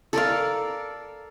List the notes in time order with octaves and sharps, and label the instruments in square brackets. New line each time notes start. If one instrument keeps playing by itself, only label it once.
[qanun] A4 A#4 D5 F5